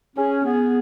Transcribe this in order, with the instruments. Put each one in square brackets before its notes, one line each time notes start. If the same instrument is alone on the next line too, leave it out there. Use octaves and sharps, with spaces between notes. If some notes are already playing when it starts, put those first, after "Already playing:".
[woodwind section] C#4 [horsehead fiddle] G#4
[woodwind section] B3 [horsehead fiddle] G#4